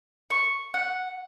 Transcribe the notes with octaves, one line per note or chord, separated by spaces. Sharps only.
C#6
F#5